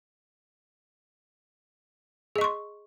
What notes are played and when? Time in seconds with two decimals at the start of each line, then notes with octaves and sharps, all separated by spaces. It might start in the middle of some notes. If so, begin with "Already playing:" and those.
2.36 G#4
2.38 D#5
2.41 C#6
2.44 C6